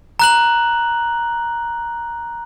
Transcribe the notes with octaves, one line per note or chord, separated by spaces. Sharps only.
A#5 F#6 F#7